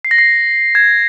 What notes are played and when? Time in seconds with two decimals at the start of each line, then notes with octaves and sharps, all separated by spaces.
0.05 C7
0.11 A#6
0.18 C7
0.75 G#6